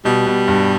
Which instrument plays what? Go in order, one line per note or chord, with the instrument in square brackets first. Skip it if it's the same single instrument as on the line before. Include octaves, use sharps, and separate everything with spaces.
[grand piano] B2 [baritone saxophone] G3
[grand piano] B2
G2